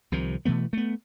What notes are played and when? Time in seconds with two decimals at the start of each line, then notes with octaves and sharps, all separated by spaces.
0.12 C2 C3 D#3 F3
0.45 B2 E3 A3 B3
0.73 A3 B3